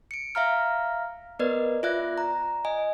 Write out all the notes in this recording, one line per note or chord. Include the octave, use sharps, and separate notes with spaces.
C#7 D7
E5 F5 A#5 F6
B3 A#4 B4 D5 D#5
F4 D5 E5 F#6
A#5
D#5 G#5